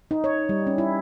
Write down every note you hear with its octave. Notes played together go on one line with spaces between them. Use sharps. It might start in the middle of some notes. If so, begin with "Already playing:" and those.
D#4
C#5
G3
C#4
E4